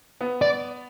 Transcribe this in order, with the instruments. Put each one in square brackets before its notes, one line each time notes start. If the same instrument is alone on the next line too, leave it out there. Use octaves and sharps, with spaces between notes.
[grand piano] B3
[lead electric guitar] D5